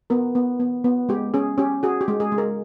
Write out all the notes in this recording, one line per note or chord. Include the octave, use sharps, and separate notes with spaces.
B3 A#4
B3
B3
B3
G#3 G4
C#4 G#4
C#4 G4
F#4 G#4
G4
G#3
G#4
G#3
A#4